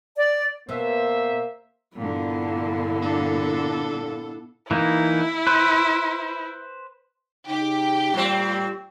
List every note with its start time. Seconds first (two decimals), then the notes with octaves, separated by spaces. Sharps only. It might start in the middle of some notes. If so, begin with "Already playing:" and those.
0.16 D5
0.69 B2 A#3 B3 C5 E5
1.97 G2 A#2 D3 B3 E4
3.02 D4 A4
4.71 E3 A#3 D#4 E4
5.47 B4 C5
7.48 C#3 D#4 G4
8.14 A2 G3 C4